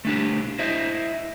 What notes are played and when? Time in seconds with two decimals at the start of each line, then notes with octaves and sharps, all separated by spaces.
0.05 A3 D4 G4
0.59 E4 C5 D#5 E5